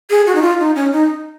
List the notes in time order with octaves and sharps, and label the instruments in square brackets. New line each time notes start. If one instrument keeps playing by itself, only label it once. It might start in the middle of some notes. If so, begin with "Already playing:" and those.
[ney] G#4
F#4
D#4
F4
D#4
C#4
D#4